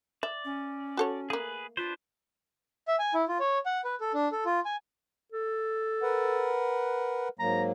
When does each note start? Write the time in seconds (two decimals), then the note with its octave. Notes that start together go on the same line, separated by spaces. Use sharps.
0.23 D5 E5
0.45 C#4
0.97 F#4 A4 C#5
1.30 A3 A#3 G#4 B4
1.77 D4 F4 B4 C5
2.88 E5
2.99 G#5
3.14 E4
3.28 F4
3.40 C#5
3.66 F#5
3.84 B4
4.00 A4
4.14 D4
4.32 A4
4.45 F4
4.65 G#5
5.32 A4
6.02 A#4 B4 F#5
7.39 G#2 F#3 A#3 A#5